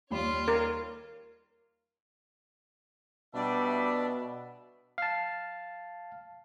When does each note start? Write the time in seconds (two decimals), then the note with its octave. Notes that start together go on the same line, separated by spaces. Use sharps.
0.10 D#2 G3 F4 C#5 B5
0.48 A#4
3.35 B2 G3 D4 D5 E5
4.98 F5 A5